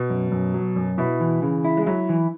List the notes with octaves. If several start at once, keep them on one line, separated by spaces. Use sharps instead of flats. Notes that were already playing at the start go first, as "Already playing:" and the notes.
Already playing: B2
F#2
F#2
F#3
F#2
B2 E4
E3
C#3 E3
E4
G#3
F#3 E4
E3